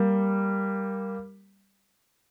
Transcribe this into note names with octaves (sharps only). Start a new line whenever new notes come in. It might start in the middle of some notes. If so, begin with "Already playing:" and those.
Already playing: G3 A#3